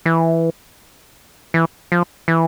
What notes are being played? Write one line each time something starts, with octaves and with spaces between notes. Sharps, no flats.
E3
E3
F3
E3